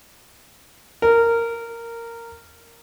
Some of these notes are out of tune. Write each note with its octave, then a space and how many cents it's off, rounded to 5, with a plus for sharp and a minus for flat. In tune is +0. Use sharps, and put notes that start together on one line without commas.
A#4 -10